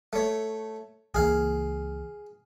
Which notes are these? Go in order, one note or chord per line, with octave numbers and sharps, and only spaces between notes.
A3 C#5
C#2 E3 A#3 G#4 F5